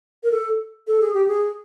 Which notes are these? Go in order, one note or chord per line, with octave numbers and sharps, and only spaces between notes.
A#4
A4
A4
G#4
G4
G#4